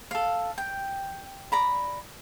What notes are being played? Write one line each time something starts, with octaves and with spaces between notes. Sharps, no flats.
A4 F5
G5
D5 A#5 B5